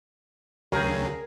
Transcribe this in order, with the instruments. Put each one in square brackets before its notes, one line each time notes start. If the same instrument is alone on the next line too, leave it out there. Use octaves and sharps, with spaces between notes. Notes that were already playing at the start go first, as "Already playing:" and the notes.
[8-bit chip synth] D2 C#3 [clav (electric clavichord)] F#3 G5 [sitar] G#4 A#4